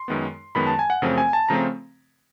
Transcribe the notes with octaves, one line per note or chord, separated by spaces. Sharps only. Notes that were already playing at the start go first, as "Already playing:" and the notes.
Already playing: C6
F#2 D#3 G#3 B3
F#2 D#3 G#3 B3 B5
A5
G#5
F#5
F#2 C#3 F3 A3 C4
G#5
A5
C#3 F3 A3 C4 A#5